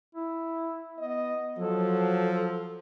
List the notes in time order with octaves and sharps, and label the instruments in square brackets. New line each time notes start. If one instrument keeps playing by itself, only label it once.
[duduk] E4
[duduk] B3 [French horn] D#5
[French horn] F3 [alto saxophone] F#3 [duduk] A4